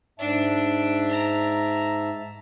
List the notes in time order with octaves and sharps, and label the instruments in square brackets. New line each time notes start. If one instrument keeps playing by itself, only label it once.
[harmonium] G#2 E5 A5 [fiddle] D4
[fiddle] A#5